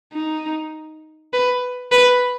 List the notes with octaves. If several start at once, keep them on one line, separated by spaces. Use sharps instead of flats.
D#4
B4
B4